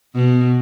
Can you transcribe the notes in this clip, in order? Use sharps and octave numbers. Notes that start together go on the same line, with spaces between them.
B2